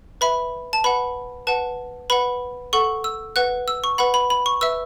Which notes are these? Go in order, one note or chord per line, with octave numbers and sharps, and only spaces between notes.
B4 E5 B5
A5
B4 F#5 B5
B4 F#5 A5
B4 F#5 B5
A4 F#5 C#6
E6
B4 F#5 F#6
E6
C#6
B4 F#5 B5
B5
B5
C#6
B4 E5 E6